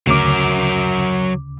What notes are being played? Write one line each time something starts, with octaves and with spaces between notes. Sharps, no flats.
D2 C#3 F#3 A#4 D6